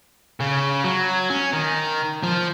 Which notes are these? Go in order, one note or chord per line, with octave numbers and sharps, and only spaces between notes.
C#3
F#3
C#4
D#3
F3